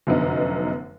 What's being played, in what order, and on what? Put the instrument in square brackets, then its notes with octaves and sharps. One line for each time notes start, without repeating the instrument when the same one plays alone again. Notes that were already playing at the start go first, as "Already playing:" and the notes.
[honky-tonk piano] F1 F#2 D3 B3 D#4